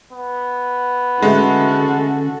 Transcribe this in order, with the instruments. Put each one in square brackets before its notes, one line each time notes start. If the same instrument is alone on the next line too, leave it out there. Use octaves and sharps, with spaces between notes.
[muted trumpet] B3
[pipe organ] D3 C#4 [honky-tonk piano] G#3 A3 [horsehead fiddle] F#4 A4